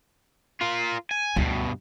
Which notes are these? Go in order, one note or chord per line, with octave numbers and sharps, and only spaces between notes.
F4 A#4
G#5
D2 G2 B2